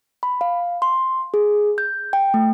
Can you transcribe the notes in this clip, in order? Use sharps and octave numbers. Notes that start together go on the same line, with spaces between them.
B5
F5
C6
G#4
G6
G5
A3